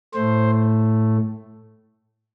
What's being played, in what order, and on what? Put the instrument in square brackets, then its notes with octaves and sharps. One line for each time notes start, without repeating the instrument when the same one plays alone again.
[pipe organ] A2 A3 C5